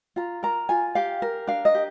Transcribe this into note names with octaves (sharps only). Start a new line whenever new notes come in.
F4 A#5
A#4 A#5
F4 G#5
G4 F5
A#4
D4 F5
D#5
G4